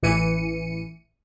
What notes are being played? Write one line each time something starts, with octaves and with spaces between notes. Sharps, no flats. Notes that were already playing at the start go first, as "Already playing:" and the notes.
A1 E3 C#7 D#7